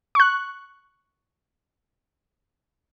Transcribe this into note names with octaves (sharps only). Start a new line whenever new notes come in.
C#6 F#6